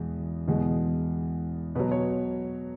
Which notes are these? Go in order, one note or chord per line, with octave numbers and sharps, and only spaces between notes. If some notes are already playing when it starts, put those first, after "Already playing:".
Already playing: E2 B2 G#3
E2 B2 G#3
B2 F#3 B4
C#5